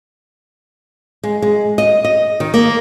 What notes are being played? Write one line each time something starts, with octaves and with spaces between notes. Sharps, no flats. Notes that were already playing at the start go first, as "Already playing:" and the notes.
G#3
G#3
D#5
D#5
D#3
A#3